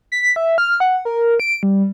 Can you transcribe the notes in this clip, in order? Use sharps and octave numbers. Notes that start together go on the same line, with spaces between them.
B6
E5
F6
F#5
A#4
D7
G3